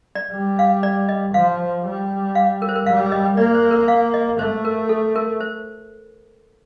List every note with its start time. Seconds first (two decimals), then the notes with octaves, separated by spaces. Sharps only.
0.15 D5
0.33 G3
0.59 F5
0.83 D5
1.09 D#5
1.34 F3 F5
1.85 G3
2.35 F5
2.62 A#4
2.69 C5
2.76 A#4
2.86 G3 F5
3.12 D#5
3.37 A#3 D5
3.54 C5
3.71 A#4
3.88 F5
4.14 D#5
4.39 A3 C5
4.65 A#4
4.89 A4
5.16 A#4
5.40 C5